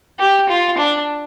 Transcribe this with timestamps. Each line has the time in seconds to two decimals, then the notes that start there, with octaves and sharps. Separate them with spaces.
0.19 G4
0.49 F4
0.78 D4